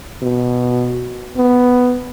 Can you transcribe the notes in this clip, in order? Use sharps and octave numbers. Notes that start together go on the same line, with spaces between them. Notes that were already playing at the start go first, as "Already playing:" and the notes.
B2
B3